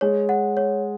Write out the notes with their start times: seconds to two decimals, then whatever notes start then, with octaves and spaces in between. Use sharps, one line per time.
0.01 G#3 C#5
0.29 F#5
0.57 C#5